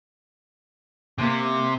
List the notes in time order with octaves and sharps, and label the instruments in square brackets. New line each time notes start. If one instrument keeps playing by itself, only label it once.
[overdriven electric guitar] C3 [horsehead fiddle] A#3